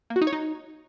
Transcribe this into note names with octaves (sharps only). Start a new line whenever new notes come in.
A#3
F#4
D#4
C#5
D#4